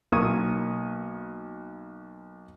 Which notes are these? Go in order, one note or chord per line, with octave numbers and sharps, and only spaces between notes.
B1 A#3 C#6 D#6 G#6 D#7